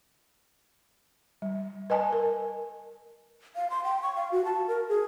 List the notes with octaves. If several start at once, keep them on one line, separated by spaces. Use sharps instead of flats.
G3
B4 D#5 G#5 A5
A#4
F5
C6
G5
C#6
F5
F#4
A5
A#4
G#4